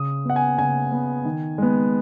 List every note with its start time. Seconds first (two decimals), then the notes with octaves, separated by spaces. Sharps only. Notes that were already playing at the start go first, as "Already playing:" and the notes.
Already playing: C#3 D#6
0.25 B3 F#5
0.36 G#5
0.58 C#3 G#5
0.92 B3
1.25 D#3
1.58 G#3 B3